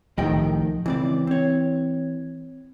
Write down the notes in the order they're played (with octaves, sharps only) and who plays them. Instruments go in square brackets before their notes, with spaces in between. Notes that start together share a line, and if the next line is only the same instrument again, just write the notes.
[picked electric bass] C2 A2 D#3 [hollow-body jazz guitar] F3 D#5 G5
[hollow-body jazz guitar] C#2 C4 D5 [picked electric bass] E3
[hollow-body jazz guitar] C4 C#5